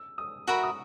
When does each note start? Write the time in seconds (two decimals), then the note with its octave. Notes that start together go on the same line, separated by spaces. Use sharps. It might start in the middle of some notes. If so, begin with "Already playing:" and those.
Already playing: E6
0.18 D#6
0.47 F#4 A#4 E5 B5 C#6
0.63 D#6